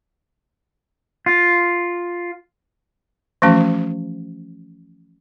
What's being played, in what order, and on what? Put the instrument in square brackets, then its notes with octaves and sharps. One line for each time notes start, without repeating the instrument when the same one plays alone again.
[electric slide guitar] F4
[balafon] E3 F3 A3 C#4 F#4